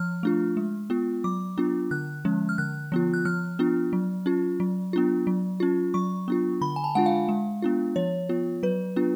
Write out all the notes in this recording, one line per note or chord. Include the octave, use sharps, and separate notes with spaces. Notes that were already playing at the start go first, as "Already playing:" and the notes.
Already playing: F3 F6
A3 D4 F4
G#3
B3 F4
F#3 D6
B3 D4 F4
D3 F#6
F3 G#3 C#4
F6
D3 F#6
F3 B3 F4
F#6
F3 F6
B3 D4 F4
F#3
C#4 F4
F#3
B3 D4 F4
F#3
C#4 F4
F#3 C#6
B3 D4 F4
D3 B5
G#5
A5
G#3 D4 F4 F#5
F5
G#3
B3 D4 F4
F3 C#5
B3 F4
F#3 B4
B3 D4 F4